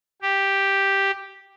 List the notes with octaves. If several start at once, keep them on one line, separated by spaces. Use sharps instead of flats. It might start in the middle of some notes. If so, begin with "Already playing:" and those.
G4